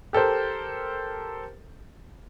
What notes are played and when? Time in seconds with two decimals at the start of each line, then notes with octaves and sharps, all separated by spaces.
0.13 G4 A4 A#4 C5